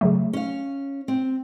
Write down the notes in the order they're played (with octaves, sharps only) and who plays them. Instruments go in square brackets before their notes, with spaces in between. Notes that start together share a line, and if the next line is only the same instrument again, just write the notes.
[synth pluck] C#3 F#3 A3
[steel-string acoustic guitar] C#4 F5
C4